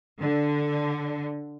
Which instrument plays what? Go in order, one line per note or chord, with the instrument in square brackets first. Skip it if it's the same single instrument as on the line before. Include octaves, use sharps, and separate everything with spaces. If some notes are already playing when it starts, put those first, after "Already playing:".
[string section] D3